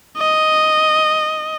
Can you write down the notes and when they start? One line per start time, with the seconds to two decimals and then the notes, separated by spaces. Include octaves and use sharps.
0.17 D#5